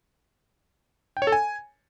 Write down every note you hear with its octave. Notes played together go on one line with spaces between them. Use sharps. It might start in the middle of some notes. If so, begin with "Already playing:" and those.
G5
C#5
A4
G#5